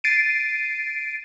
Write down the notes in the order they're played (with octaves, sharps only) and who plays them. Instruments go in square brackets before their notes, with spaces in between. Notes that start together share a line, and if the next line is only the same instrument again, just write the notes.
[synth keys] A6 C7 D7 D#7